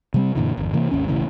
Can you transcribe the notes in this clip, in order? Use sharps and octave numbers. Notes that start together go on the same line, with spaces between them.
C3 G3 C4
F#2 A#2 D3 E3
G1 E2
C3 E3 A#3
G#1 D#2 C#4
E1 A1 C#3 E3